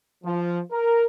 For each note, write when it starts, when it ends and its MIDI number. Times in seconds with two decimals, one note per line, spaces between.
0.24 0.59 53
0.71 1.05 70